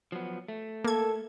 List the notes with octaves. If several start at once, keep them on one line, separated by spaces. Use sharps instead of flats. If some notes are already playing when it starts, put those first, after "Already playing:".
F3 F#3 B3
A3
A#3 A4 G#6